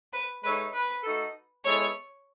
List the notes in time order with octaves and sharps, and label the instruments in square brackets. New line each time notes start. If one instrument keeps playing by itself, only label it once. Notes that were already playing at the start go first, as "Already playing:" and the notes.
[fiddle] B4
[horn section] G#3 D#4 A4 C#5 E5 [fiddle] B4
[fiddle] B4
[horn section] A3 D#4 F#4 A4
[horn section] G#3 B3 E4 A4 [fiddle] C#5